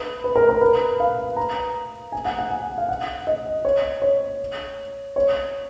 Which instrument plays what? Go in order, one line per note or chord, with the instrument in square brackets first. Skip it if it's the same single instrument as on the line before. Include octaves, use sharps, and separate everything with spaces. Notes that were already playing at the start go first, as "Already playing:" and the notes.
Already playing: [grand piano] B4
B4
A#4
A#4
B4
F5
A#5
G#5
F#5
F#5
G#5
F5
F#5
D#5
C#5
C#5
C#5